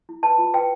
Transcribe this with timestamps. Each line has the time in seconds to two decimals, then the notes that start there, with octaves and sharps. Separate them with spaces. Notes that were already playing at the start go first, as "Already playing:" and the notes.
0.09 E4
0.23 B4 A5
0.38 F4
0.54 B4 G5